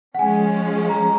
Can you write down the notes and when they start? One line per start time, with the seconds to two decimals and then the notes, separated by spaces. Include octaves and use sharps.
0.15 F#5
0.19 F3 G#3 C#4 G#5
0.89 A#5